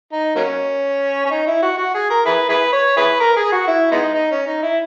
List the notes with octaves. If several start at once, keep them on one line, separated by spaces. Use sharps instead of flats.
D#4
F#3 A#3 C#4
C#4
D#4
E4
F#4
F#4
G#4
A#4
E4 G#4 B4
E4 G#4 B4
C#5
E4 G#4 B4
A#4
G#4
F#4
E4
G#3 B3 D#4
D#4
C#4
D#4
E4